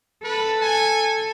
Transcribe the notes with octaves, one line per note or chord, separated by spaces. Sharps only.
A4 B4
G#5